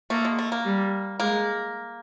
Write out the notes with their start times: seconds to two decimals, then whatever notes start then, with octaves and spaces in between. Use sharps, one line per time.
0.10 A3 A#3
0.25 G#3
0.39 A3
0.52 A#3
0.65 G3
1.20 G#3 A#3